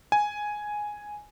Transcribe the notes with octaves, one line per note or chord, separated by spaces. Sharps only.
G#5